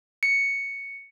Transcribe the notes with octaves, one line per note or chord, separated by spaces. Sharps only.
C#7